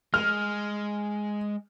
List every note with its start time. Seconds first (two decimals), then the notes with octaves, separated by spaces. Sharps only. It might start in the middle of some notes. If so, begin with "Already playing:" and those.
0.14 G#3 F6